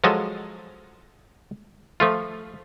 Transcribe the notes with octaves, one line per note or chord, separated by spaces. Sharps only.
F3 F#3 G#3 A4 D#5
F3 A3 F4